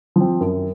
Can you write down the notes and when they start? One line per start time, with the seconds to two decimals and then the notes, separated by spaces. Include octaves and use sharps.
0.16 F3 C4
0.40 F#2